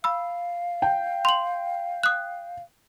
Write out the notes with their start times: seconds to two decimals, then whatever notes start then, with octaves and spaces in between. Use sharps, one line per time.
0.04 F5 B5 E6
0.82 G5
1.25 C6 F#7
2.03 D#6 F#6